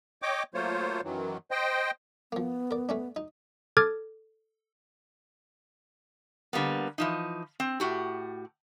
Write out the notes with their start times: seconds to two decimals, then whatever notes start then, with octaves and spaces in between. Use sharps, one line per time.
0.22 C#5 D#5 G5 D6
0.54 F#3 A3 A#3 F4 C5 C#5
1.04 F#2 D#3 E3 F#3
1.51 C5 D#5 G5
2.32 F3 A#3 B3
2.71 A#4 D5
2.89 A3 C#4 D4
3.16 D#4
3.77 A4 D6 F6 G#6 A6
6.53 D3 G3 A#3 B3
6.98 E3 F3 D#4
7.60 C4
7.80 A2 F#4 G4